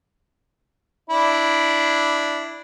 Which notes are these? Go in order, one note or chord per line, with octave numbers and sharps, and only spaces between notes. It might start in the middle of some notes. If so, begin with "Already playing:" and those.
D4 E4